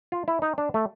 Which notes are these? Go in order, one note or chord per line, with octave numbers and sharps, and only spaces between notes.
F4
E4
D#4
D4
A3